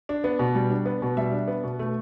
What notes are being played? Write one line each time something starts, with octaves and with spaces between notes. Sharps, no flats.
D4
B3
B2
G3
D4
B3
B2
G3 E5
D4
B3
B2
A3